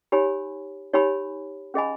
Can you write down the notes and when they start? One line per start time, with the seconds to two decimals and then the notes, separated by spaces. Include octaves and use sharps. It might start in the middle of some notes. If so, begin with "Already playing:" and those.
0.12 D#4 G4 C#5 G#5 B5
0.94 D#4 G4 C#5 G#5 B5
1.74 C#4 G#4 D#5 G#5 B5